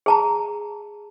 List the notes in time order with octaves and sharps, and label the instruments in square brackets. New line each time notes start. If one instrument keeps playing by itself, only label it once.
[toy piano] G#4 A5 A#5